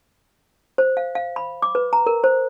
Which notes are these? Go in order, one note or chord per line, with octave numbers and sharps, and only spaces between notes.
C5
F5
F5
B5
D6
B4
A#5
A#4
C5